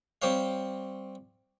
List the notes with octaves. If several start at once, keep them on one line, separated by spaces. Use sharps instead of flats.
G3 C4 G4 C5 C#5 F5